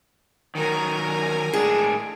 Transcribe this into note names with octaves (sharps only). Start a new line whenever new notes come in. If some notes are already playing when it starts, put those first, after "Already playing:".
D#3 F#3 A#4 G#5
A2 G#3 D4 G#4